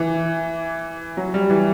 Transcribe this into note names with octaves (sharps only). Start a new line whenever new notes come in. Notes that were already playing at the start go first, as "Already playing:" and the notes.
Already playing: E3
F#3
G3
E3